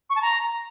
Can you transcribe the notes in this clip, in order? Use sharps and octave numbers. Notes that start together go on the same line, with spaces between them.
C#6
A5
A#5